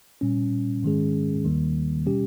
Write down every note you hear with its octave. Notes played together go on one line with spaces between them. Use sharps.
A#2 G3 C#4
G#2 D#3 G#3 C#4 G#4
D#2 D#3 G3 A#3
B2 G3 C#4 G4